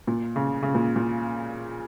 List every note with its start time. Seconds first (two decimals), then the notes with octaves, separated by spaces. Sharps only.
0.07 A#2
0.36 C#3
0.63 C#3
0.75 A#2
0.96 A#2